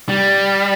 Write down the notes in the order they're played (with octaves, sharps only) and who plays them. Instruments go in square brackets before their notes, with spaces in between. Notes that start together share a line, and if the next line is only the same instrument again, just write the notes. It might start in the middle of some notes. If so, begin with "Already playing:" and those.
[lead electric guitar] G3